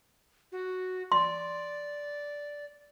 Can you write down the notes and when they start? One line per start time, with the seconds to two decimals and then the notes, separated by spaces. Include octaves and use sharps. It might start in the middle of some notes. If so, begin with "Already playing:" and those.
0.52 F#4
1.12 D5 C6